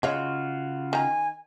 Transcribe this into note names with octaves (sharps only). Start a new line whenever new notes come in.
C#3 G#3 F4 F#4 C#5 F5
D#3 G#5 A#5